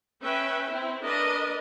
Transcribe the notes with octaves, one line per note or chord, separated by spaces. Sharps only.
C#4 B4 E5 G5
C4 E4
D4 A#4 B4 D#5